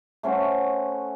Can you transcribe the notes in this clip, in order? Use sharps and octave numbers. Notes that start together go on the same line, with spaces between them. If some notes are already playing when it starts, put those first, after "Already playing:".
A3 C#4 C5 F#5